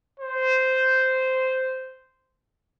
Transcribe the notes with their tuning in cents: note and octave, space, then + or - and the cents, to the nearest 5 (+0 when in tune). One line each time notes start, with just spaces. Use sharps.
C5 -10